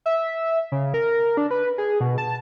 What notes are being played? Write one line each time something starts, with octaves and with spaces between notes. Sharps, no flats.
E5
C#3
A#4
D4
B4
G#4
B2
A5